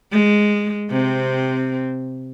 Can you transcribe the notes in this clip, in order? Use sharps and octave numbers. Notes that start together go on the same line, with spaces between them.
G#3
C3 C4